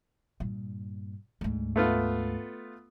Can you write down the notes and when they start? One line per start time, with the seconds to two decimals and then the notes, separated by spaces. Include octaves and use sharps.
0.40 G2 A#2
1.41 D2 G#2
1.76 A3 B3 F4